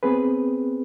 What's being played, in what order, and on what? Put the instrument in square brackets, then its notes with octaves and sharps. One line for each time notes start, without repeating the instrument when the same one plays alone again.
[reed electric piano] B3 C4 G#4 B4